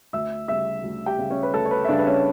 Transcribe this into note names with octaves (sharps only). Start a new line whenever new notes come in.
D2 E5 E6
C#3 G3 E5 E6
D2
G4 G5
C#3 G3
C#4 C#5
B4
D2 A4
C#5
B4
E5
C#3 G3 D4 D5
B4
C#4 C#5